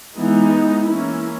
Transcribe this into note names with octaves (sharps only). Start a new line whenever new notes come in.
E3 G#3 B3 D#4
E3 A#3 C#4 E4